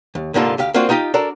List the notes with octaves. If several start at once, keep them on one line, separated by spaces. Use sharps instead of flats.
D#2
C2 G#2 D3 A#3 F4 A4
D2 G4 F5
A#3 C4 D4 F4 F#4
B3 D#4 F4 G4 D#5
D4 F#4 A4 A#4 D5